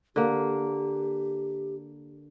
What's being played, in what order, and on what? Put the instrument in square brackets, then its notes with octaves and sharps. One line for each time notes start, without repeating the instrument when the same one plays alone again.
[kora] D3 A#3 [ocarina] G4